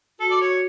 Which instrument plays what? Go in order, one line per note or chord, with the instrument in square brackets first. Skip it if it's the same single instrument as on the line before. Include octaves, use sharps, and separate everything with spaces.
[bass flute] F#4 [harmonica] A4
[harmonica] D5
C#5